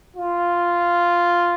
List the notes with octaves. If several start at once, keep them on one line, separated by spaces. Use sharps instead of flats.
F4